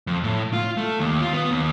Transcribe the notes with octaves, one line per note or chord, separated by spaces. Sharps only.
F2
A2
F4
A3
D#2
F4
B3
D#2